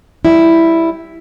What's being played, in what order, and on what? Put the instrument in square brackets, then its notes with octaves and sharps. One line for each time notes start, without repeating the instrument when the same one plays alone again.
[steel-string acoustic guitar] G3 E4